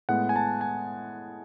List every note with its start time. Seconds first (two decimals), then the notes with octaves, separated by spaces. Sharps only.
0.09 A2 G#3 B3 F#5
0.29 G#5
0.36 A5
0.61 G#5